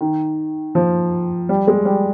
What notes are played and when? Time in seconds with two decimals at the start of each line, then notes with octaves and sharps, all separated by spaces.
0.01 D#3
0.75 F3
1.49 G3
1.67 G#3
1.85 G3